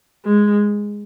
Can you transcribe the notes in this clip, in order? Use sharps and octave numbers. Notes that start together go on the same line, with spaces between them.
G#3